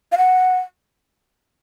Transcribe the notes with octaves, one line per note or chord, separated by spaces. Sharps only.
F5
F#5